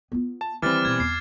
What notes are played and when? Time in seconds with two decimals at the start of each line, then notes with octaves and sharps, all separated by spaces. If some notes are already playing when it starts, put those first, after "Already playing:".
0.12 B3 F4
0.41 A5
0.62 D#3 E3 G3 C4 D6 F6 A6
0.85 B2 B3 G#6
1.00 E2 C7